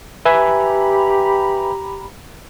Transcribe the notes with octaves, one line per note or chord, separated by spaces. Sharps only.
G4 B4 E5 G#5 A#5 B5